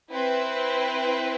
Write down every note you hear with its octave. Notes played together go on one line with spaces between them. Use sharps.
C4 E4 B4